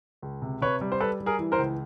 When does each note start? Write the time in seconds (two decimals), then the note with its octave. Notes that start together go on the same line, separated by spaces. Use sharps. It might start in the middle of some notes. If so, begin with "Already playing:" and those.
0.22 C#2
0.42 C3
0.61 C3 B4 C#5
0.81 G3
0.92 C5
1.00 G3 A4 B4
1.20 G3
1.26 G#4 A#4
1.39 E3
1.52 A#4 C5
1.59 C#2